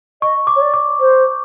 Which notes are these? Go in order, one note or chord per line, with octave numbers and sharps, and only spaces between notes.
D#5 C#6
D6
C#5
D5
D6
C5